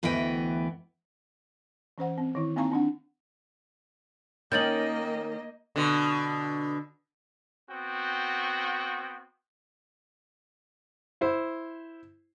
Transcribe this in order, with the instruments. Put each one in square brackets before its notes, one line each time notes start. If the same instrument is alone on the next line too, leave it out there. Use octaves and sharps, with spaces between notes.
[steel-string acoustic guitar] D2 E3 B3 D#5 G5
[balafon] E3 C#4 C5 F#5
C4
D#3 E4
A#3 C4 D#4 F5 A#5 C#6
C4 D4 F#5
[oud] D#3 C#4 D#4 [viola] A#3 D#5 [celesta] G6 A6 F#7
[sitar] B2 D3
[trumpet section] B3 C4 F#4 G5
[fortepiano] E4 C5